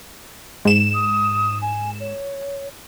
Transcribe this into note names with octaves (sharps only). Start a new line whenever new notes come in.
G#2 E7
D#6
G#5
C#5